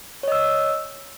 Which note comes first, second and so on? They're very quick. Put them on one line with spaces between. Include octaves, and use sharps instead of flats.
C#5 D#5 E6